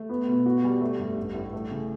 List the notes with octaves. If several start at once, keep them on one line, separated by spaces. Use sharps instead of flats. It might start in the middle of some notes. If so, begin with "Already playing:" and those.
Already playing: A3
B3
B2
F#4
G3
A3
G2
A1
A2
A3
C#3